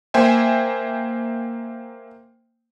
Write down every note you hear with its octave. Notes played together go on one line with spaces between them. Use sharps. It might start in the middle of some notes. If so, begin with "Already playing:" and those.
A#3 C5 E5 G5 G#5